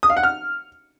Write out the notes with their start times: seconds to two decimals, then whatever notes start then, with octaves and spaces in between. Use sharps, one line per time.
0.03 D#6
0.10 F5
0.17 F#5
0.23 F6